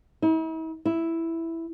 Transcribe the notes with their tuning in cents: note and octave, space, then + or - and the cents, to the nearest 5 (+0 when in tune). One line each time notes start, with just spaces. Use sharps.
E4 -45
E4 +0